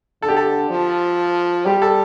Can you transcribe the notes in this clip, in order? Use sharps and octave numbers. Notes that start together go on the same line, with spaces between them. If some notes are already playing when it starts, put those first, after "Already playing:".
D3 A4
G4
A4
F3
G3 G4
A4